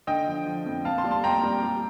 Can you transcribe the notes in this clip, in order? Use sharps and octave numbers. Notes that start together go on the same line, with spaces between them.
D3 D#5 G5
F3
F3
F2
A#2 F5 A5
A5 C6
G3
A5 C6
A#2 G5 A#5
G3
G3